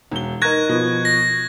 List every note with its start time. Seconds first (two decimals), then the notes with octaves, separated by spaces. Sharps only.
0.11 E1 G7
0.42 D#4 A#4 C#6 F#6 G#6 A#6
0.69 B2 F3
1.05 A#6